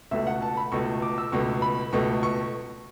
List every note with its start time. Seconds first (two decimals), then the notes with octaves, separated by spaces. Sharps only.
0.11 C#2 B2 A3 E5
0.27 F#5
0.42 A5
0.57 B5
0.72 C#2 B2 A3 C#6
1.02 D6
1.18 E6
1.32 C#2 B2 A3 C#6
1.62 B5
1.93 C#2 B2 A3 C#6
2.23 C#6